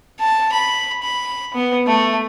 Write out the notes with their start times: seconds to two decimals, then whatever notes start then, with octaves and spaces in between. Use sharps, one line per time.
0.20 A5
0.53 B5
1.03 B5
1.54 B3
1.87 A3